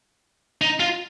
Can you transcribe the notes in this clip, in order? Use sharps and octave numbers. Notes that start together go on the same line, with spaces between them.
D#4
F4